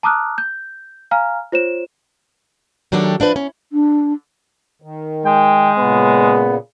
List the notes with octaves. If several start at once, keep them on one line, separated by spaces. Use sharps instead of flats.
A5 A#5 D6 D#6 F6 F#6
G6
F5 G#5 A#5 F6
F4 C5 C#5 E7
D#3 F#3 A3 D4 G4 A4
F3 D4 E4 B4
C#4
D4
D#3
G#3 G5
A#2 C#3 B3